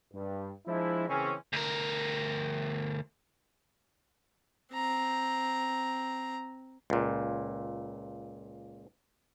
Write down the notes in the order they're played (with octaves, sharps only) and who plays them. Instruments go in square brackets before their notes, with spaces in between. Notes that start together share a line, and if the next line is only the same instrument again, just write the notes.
[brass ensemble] G2
F3 G#3 D4 E4
C#3 E3 A#3 C4 C#4
[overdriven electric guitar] D2 A#4
[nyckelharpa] C4 A#5
[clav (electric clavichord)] C#2 A#2